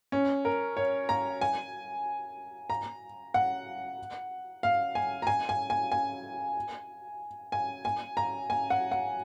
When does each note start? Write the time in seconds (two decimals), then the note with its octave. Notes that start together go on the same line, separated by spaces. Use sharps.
0.12 C#4
0.45 A#4
0.77 C#5
1.09 A#5
1.41 G#5
2.70 A#5
3.34 F#5
4.63 F5
4.95 G#5
5.22 A#5
5.27 G#5
5.49 G#5
5.70 G#5
5.92 G#5
7.52 G#5
7.85 G#5
8.17 A#5
8.50 G#5
8.70 F#5
8.91 F#5